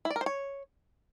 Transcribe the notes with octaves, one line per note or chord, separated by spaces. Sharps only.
E4
D5
A#4
C5
C#5